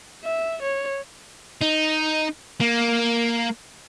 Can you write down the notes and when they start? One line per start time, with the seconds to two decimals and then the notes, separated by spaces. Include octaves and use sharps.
0.24 E5
0.62 C#5
1.61 D#4
2.60 A#3